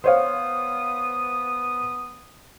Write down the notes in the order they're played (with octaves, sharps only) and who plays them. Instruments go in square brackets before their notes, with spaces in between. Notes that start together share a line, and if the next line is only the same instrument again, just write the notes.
[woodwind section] B3 D#6 [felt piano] C5 C#5 F5